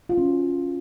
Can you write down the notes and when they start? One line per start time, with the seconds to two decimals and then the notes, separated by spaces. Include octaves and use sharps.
0.09 F4
0.18 C#4
0.26 F#4